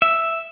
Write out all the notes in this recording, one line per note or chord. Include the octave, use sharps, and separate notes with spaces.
E5